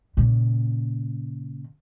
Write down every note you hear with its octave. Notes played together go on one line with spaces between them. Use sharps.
A#2 C#3